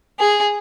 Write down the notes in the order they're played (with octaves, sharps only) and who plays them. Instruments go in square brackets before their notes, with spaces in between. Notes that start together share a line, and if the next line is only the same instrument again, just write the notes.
[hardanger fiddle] G#4